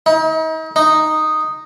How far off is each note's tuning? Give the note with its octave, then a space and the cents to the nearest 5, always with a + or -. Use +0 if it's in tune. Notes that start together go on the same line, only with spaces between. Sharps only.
D#4 +40
D#4 -5